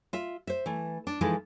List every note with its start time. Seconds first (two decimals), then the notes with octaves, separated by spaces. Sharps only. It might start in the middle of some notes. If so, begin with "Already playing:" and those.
0.13 F4 E5
0.47 C5 E5
0.66 E3 A3
1.07 D4
1.21 E3 F3 G#3 D#4 E4 A4